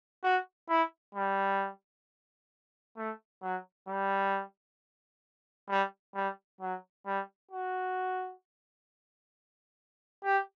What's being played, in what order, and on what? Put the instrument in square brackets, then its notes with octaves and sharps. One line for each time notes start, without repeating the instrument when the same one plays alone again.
[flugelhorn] F#4
E4
G3
A3
F#3
G3
G3
G3
F#3
G3
F#4
G4